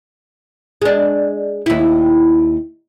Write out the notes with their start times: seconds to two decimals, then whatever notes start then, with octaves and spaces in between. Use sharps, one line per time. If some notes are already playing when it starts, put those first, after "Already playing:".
0.82 G#3 D4
1.66 D#2 E4